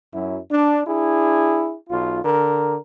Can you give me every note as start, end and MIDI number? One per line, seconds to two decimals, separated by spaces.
0.13 0.38 42
0.13 0.38 54
0.13 0.38 64
0.50 0.81 62
0.87 1.75 62
0.87 1.75 64
0.87 1.75 68
1.90 2.20 35
1.90 2.20 65
2.24 2.76 50
2.24 2.76 70